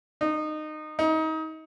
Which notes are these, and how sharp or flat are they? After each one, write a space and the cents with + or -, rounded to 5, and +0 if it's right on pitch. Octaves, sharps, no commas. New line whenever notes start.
D#4 -20
D#4 +30